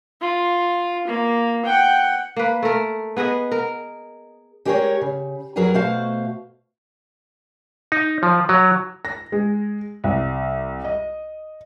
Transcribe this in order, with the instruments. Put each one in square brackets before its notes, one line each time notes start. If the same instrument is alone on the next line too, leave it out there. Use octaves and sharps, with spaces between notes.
[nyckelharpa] F4
A#3
F#5 G5
[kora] A#3 B4
A3 A#4
B3 G#4 B4 D#5
A#4
[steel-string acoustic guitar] G#3 G4 G#4 A#4 B4 C#5
C#3
F2 F#3 G#4 A#4 B4 G#5
B2 A3 F#4 C5 F5
[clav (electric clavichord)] D#4
F3
F#3
[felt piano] A#6
G#3
C2
D#5